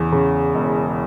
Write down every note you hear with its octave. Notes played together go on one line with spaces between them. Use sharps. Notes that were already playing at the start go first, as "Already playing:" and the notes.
Already playing: E2 C#3
C#3
E1